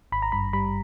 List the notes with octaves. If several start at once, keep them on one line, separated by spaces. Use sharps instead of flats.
G#1 B5
A#5
G2 B5
G3 B5